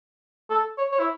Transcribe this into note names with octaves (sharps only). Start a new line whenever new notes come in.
A4
C#5
C#5
E4